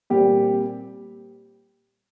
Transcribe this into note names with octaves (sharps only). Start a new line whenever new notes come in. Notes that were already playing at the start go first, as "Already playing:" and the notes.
A#2 G3 C4 G4